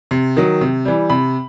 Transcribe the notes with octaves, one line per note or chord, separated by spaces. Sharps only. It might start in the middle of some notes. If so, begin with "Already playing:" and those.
C3
D#3 F#3
C3
E3 G3
C3 B5